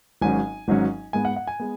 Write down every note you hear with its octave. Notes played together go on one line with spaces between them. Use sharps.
G#1 G#2 F#3 C#4 G#5
G#1 G#2 F#3 C#4
G#2 G#3 B3 G#5
F#5
F#5
G#5
G#3 B3